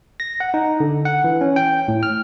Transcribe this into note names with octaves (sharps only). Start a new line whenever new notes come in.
A#6
F#5
D#4
D3
F#5
E3
C#4
G5
A2
F6